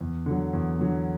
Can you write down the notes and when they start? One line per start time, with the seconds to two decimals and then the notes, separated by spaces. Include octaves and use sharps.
0.01 E2
0.26 D3 F#3
0.53 E2
0.79 D3 F#3